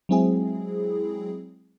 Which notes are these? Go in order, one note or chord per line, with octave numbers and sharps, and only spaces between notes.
F#3 G#3 C4 E4 G#4